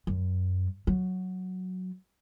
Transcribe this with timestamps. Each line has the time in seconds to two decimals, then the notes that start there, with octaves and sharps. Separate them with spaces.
0.07 F#2
0.87 F#3